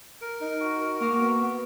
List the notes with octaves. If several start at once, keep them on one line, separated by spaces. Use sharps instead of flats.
A#4
D#4
F#4
A#4
A#3 F#4
B3
B3